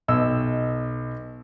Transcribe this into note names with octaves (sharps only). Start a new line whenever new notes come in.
B1 D#5 E6